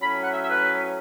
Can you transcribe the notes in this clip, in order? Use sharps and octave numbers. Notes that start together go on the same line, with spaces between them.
A2 F#3 C#4 B5
F#5
E5
E5
B4